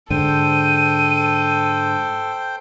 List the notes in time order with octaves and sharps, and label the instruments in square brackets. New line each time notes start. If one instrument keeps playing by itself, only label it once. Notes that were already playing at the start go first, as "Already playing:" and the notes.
[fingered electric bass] G#2 D3 [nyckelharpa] A4 [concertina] C5 G5 [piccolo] D#7